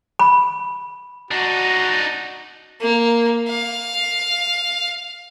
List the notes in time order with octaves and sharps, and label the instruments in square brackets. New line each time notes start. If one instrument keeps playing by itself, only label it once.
[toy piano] B5
[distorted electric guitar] D4 D#4 [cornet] F#4
[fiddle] A#3
F5